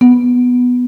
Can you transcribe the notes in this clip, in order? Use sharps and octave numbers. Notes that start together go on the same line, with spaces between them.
B3